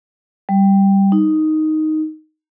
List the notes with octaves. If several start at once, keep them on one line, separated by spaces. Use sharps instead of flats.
G3
D#4